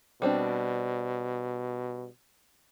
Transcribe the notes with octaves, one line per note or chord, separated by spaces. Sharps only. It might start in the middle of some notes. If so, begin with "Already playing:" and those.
B2 G3 C4 D4